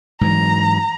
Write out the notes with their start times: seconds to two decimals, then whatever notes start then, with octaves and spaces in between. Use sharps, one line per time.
0.21 G#2 E3 F#3 A#5